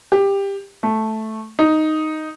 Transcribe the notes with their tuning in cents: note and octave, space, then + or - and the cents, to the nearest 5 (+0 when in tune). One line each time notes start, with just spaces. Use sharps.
G4 +15
A3 -5
D#4 +0